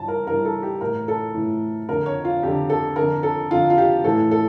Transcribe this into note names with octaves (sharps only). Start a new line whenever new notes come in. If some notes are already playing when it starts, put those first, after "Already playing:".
Already playing: G2 E3 A5
A#4
G2 E3 A#4
A4
G4
A2 E3 A#4
A4
A2 E3
F2 D3 A#4
C#5
F4
F2 D3 G4
A4
F2 D3 A#4
A4
F2 D3 F4
F4
G4
A2 E3 A4
A4